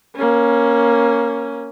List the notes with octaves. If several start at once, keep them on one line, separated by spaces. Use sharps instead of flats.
A#3 C#4